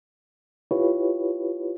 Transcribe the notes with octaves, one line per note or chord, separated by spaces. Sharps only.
E4 F4 G4 B4 C#5